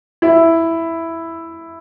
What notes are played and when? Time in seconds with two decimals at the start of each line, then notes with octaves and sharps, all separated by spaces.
0.22 E4